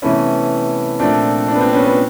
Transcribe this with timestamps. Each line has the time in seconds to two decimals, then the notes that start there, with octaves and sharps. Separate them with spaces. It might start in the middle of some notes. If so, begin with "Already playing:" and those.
0.02 C3 E3 A3 B3 C#4
0.99 A#2 F3 A3 C4 D4
1.48 C4 D4
1.55 B3
1.61 C4
1.73 B3 C#4
1.85 B3